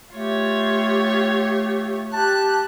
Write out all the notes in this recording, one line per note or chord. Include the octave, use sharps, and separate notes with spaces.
A3 F4 G4 C#5
G4 A5 F#6